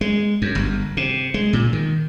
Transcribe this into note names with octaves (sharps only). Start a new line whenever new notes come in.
G#3
F#2
G1
C3
G#3
A#2
D#3